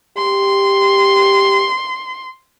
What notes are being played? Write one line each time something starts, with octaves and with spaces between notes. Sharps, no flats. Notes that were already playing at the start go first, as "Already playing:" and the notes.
G4 C6